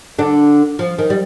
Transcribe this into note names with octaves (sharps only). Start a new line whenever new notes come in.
D3 D4
F3
D#3
G3